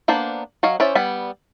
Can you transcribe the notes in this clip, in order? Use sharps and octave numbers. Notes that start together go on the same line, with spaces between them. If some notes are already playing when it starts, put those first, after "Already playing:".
A#3 B3 D4 C5
F#3 C#5 D#5 F5
C#4 E4 C5 D5 E5
G3 B3 B5